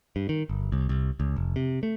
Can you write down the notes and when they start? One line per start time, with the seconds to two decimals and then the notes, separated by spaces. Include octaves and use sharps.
0.16 G2
0.29 D#3
0.49 G1
0.72 C2
0.89 C2
1.20 C#2
1.36 F1
1.56 C3
1.83 A3